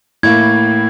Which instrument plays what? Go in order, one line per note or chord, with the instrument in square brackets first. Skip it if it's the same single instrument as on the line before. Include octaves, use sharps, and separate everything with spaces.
[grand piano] A2 A#3 [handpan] E4 [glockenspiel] G#6